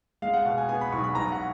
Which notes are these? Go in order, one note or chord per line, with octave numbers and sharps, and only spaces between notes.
G#3 F5
F#5
B2 F5
G#5
B3 G#5
B5
B1 C#6
B5
B1 A#5
F#5